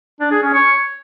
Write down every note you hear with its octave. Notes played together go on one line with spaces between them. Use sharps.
D4
G#4
C#4
C#5